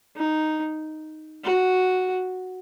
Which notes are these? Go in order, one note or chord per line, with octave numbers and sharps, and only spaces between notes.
D#4
F#4